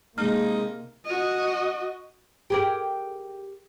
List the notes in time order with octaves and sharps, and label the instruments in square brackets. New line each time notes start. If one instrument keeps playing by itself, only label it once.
[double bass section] C3 A#3 [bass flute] G#3 [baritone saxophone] D#4 [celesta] F6
[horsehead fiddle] F#4 D#5
[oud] G4 G#4 A#4